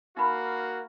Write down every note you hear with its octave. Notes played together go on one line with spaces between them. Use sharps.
A#3 D#4 F#4 F5 B5